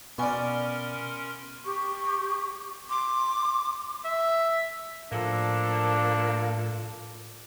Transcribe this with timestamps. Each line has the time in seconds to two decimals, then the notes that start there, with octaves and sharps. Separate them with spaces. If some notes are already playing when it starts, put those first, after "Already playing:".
0.18 B2 B3 C#4 A#4 D5 G#5 C6 C#6
1.65 G4 C#6
2.90 C6 D6
4.06 E5
5.12 A2 F3 A#3 D4 A4